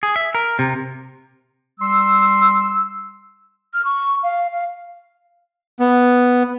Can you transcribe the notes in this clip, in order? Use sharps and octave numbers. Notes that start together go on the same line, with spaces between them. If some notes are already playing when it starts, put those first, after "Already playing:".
G#4
E5
A#4
C3
G3 C6 E6
F6
C#6
F5
F5
B3